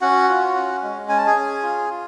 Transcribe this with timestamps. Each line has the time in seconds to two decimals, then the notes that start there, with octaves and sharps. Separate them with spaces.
0.01 C#4 F#4 F#5
0.28 F4
0.55 C#4
0.83 G#3
1.09 C#4 G#5
1.18 A5
1.27 G#4 G#5
1.35 C#4
1.63 F4
1.90 F4